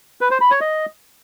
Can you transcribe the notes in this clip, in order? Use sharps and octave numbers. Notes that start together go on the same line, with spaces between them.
B4
C5
B5
C#5
D#5